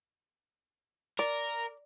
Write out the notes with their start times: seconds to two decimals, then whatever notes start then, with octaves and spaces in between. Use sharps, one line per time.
1.19 A#4 D5